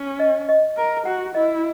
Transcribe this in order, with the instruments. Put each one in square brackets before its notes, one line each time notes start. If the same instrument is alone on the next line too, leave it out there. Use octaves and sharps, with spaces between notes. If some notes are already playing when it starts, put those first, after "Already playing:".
Already playing: [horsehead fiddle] C#4
[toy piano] D#5
D#5
[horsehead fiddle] A#4
[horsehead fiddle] F#4 [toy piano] F#5
[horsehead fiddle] E4 [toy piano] D#5